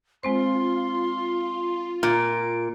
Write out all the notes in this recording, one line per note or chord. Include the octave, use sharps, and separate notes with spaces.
G#3 C4 F4 C5 C6
A#2 F4 D7